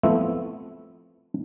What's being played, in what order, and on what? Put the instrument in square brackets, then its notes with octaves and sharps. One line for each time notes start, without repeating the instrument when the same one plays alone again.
[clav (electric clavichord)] F3 A3 B3 C4 E4 E5